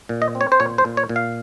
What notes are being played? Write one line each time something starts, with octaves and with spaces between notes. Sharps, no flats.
A#2
D#5
C4
C#5
C5
A#2 C#5
C5
A#2
C#5
A#2
F5